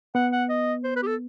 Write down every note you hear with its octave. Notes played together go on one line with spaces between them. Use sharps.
B3 F#5
F#5
D#5
C5
B4
G4
A4